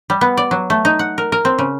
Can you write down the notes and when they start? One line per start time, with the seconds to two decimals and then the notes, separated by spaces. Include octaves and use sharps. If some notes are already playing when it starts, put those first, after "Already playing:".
0.10 G3
0.21 B3
0.37 D5
0.51 F#3
0.70 A3
0.85 D#4
0.99 F#5
1.18 A#4
1.32 A#4
1.45 C4
1.59 C#3